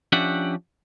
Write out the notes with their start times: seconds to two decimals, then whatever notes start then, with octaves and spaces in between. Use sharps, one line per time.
0.12 F3 C#4 D4 G4 E5 F#5